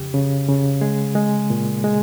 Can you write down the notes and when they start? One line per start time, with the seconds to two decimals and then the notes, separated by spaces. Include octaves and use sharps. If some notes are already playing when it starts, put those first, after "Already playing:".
Already playing: F2 C#3 G4
0.14 C#3
0.48 C#3
0.81 G#3 G#4
1.15 G#3
1.50 A#2
1.84 G#3